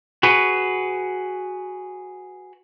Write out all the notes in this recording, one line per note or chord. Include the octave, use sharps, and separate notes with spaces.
F#4 G#4 B4